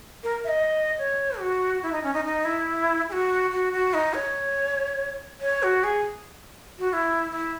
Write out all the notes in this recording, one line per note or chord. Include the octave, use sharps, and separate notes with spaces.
A#4
E5
D#5
C#5
F#4
E4
D#4
C#4
D#4
D#4
E4
G#4
F#4
F#4
F#4
D#4
C#5
C#5
F#4
G#4
F#4
F#4
E4
E4